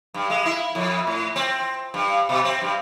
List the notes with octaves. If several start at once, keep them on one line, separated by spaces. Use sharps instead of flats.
G2
G#3
E4
F2
A2
C4
G2
B2
C4
G2